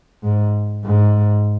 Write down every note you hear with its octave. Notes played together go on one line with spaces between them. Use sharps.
G#2
G#2